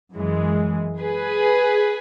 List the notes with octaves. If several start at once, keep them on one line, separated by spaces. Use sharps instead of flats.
F#2 E3 G#3
G#4 B4